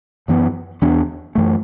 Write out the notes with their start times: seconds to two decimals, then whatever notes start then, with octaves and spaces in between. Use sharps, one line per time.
0.28 F#2 E3 B3
0.82 E2 E3 B3 D4
1.35 F#2 E3 A3